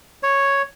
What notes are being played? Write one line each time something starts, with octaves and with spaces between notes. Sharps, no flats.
C#5